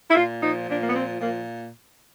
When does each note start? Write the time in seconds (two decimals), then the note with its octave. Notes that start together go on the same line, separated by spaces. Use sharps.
0.10 E4
0.15 A#2 F4
0.41 F3 D#4
0.68 A#2 D4
0.81 A#3
0.87 B3
0.94 F3 C4
1.20 A#2 A#3